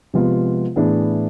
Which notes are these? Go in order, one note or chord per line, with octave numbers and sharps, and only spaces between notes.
C3 F3 G#3 B3 F4
A2 E3 B3 D4 G#4